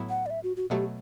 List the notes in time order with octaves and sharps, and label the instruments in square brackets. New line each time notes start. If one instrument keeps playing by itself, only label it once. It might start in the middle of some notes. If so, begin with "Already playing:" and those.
Already playing: [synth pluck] A2 F#3 B3 E4
[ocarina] F#5
D5
E5
F#4
F#4
[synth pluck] B2 F#3 A3 [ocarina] G4